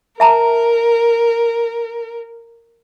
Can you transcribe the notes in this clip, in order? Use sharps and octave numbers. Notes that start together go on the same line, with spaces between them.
A#4 E5 A5 A#5